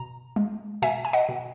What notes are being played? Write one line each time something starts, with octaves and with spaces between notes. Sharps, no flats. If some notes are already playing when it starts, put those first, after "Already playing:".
Already playing: B2 A#5
G#3
B2 E5 G#5
G#5
D#5 F#5
B2